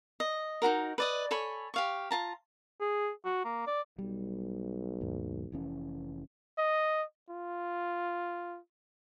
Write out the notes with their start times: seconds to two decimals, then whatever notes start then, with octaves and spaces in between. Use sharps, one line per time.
0.20 D#5
0.62 D#4 E4 F#4 A#4
0.98 B4 D5 D#5
1.31 A4 C#5 G#5 B5
1.74 G4 F5 C#6
2.11 F4 A5 A#5
2.80 G#4
3.25 F#4
3.45 A#3
3.67 D5
3.99 B1 G3
5.01 D#2 G#2
5.52 F1 E3 C#4
6.58 D#5
7.29 F4